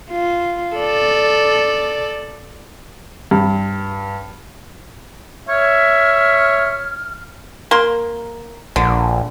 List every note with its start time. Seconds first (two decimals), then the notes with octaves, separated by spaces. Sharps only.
0.11 F4
0.76 A4 D5
3.31 G2
5.49 C#5 E5 F6
7.71 A#3 C6
8.76 A#1 D3